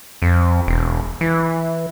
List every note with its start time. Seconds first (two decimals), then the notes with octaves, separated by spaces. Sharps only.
0.22 F2
0.67 E1
1.21 E3